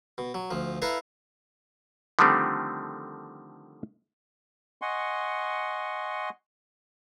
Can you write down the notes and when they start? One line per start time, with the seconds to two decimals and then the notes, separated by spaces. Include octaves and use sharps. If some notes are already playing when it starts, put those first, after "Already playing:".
0.18 B2
0.34 F#3
0.51 D2 F3
0.82 E4 A4 B4 F5 A#5
2.19 D3 D#3 F3 G3 A3 C4
4.81 D#5 F#5 G#5 C6 C#6